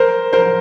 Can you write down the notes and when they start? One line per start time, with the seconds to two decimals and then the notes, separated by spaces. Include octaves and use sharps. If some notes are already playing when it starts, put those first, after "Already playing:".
Already playing: A#4 C5
0.33 A#4 C5